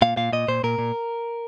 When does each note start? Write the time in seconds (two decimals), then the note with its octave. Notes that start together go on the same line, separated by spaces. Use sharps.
0.02 A#2 F5
0.17 A#2 F5
0.32 A#2 D#5
0.48 A#2 C5
0.63 A#2 A#4
0.78 A#2